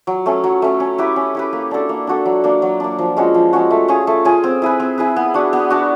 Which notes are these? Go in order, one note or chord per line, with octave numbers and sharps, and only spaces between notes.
F#3
A3 C#4
F#3
A3 C#4
C#4
E4 G4 B4
C#4
E4 G4 B4
A#3
D4 F#4 A4
A#3
D4 F#4 A4
F#3
A#3 D4
F#3
A#3 D4
F3
G#3 C#4 F#4
F3
G#3 C#4 F#4
A3
C#4 F4 G#4
A3
C#4 F4 G#4
C4
E4 G#4 B4
C4
E4 G#4 B4
B3
D4 F#4
B3
D4 F#4